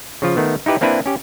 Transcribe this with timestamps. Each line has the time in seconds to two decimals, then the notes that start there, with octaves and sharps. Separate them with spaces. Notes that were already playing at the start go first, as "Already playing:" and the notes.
0.22 C#3 F3 F4
0.37 D#3 A3 B3
0.66 D#4 E4 G4 B4
0.81 A#3 C4 D4 E4 B4
1.06 C#4 G4